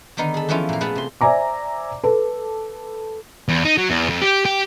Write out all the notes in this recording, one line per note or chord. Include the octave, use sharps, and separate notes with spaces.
D3 D#3 B3 D#4 A#4
G#4 A4
E3 F3 B3 C#4 E4 F4
A#2 A#3
A3 B3 F4 G#4 B4
C3 C6
C5 D5 E5 G#5 A#5 D6
A4 B4
E2
D#4
F#3
E2
F2
G4
G4